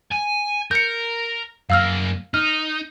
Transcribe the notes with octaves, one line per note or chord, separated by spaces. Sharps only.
G#5
A#4 G6 C#7
F#2 A#3 F5 E6 F6
D#4 F6